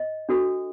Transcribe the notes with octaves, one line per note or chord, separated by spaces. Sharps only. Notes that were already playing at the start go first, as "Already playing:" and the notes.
Already playing: D#5
D4 F#4 A4